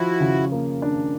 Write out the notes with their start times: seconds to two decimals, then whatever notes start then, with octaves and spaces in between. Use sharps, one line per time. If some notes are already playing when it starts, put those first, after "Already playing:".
Already playing: F3 E4 F#4
0.20 C#3
0.52 A#3
0.82 D4